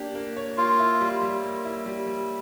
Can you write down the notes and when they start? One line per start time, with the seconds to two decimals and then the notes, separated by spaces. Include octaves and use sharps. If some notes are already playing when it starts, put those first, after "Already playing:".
Already playing: A#3 D4 G4
0.15 A#3
0.37 C#5
0.58 A#3 F4
0.79 E4
1.00 G3
1.22 G3
1.43 A#3
1.65 E4
1.86 G3
2.07 G3